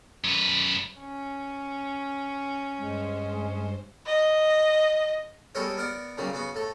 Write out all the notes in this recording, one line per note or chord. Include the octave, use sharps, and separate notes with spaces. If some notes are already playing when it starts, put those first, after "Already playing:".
F#2 B4
C#4
G2 G#3 C5
D#5
G3 G#3 B3 A4 A#4 C#5
B3 A#4 D5 F#5
A#2 C#3 F#3 G3
C#3 B3 F#4
A2 A4